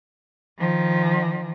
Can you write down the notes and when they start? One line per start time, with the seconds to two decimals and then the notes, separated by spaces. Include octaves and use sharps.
0.59 D#3 F3